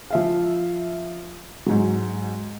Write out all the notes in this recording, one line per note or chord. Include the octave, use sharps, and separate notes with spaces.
F3 E5 F5
G#2 F#3